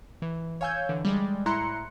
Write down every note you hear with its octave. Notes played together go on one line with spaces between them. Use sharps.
E3
C#5 F5 G#5 E6 G6 G#6
D3 E3
G3 G#3 D5
A2 E4 A#5 C6 F#6 C#7